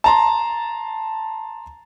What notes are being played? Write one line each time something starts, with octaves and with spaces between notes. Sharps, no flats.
A5 A#5 C6